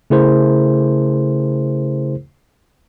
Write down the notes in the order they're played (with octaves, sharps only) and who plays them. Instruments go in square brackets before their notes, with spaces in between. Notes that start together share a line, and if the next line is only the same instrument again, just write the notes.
[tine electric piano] C#3 A3 E4 G#4 A#4 C5